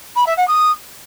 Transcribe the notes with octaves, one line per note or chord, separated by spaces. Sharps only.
B5
E5
F#5
D#6